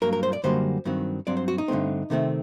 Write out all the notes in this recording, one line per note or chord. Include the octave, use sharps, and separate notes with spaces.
G2 F#3 A#3 A#4
A#4
C5
D5
F#2 D3 G3 A#3 C5
G2 D#3 F#3 C4
G2 F#3 C4 D5
C5
F#4
D#4
G2 D3 F#3 A3 C4
C3 D#3 A3 C4